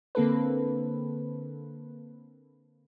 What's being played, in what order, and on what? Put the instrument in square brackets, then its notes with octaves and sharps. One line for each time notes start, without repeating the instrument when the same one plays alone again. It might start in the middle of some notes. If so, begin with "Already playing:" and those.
[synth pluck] D3 A#3 C4 A4 B4